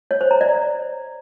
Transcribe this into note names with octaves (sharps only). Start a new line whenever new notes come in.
C#5
C5
A#5
D5